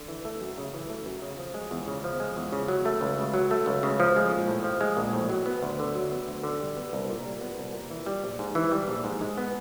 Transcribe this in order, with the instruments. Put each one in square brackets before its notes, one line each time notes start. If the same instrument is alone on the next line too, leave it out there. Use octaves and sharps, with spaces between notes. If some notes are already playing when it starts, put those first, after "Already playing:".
Already playing: [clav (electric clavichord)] D3
E3
A3
F#2
C#3
E3
A3
F#2
C#3
F3
G#3
E2
C#3
F3
G#3
E2
C#3
F#3
A3
C#2
C#3
F#3
A3
C#2
C#3
F3
G#3
A#1
A2
F3
G#3
A#1
A2
F#3
B3
D2
D3
F#3
B3
D2
D3
G3
B3
C2
A#2
G3
B3
C2
A#2
E3
G3
A#1
G#2
E3
G3
A#1
G#2
G#3
B3